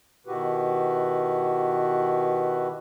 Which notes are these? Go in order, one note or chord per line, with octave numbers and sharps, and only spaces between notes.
B2 D#3 E4 F#4 G4 B4